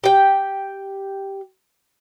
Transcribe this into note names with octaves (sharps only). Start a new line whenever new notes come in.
G4 G5